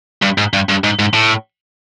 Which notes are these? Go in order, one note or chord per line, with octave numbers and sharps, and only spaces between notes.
G2
G#2
G2
G2
G#2
G#2
A2